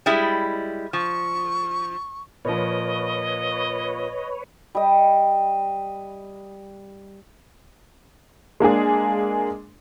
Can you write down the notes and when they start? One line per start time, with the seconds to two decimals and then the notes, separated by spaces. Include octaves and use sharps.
0.06 G3 G#3 E4
0.93 F3 C#6
2.45 A#2 F3 B4 C#5 D#5
4.75 G3 D#5
8.60 G#3 A#3 D4 G#4